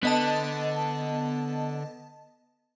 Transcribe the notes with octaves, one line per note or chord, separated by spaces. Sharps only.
D3 B3 D#5 A5